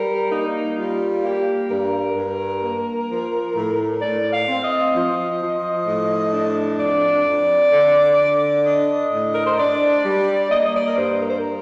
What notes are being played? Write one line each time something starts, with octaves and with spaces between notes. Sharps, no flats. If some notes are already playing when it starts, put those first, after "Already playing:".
Already playing: G3 A#4
A#3 D#4
G3 F4
A#3 G4
G2 A#4
G2
A#3
F3
A2
A2 D5
F5
C4
D#5
F3
F3
A2
D4
F2 D5
F2
D3
D3
D4 D#5
A2
A#4
C5
D4 D5
G3
A#3 D#5
D#5
D5
A#4
G2 C5
A#4
C5
A#4